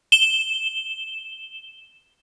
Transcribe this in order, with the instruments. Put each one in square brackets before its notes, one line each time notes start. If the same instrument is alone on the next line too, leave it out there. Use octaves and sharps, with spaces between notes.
[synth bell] E7 G7